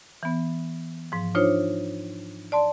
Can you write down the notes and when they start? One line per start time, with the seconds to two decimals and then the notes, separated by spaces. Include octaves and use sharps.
0.23 E3 B3
1.12 G#2 F3
1.35 D4 D#4 F4 C5 C#5
2.52 D5 A5 C6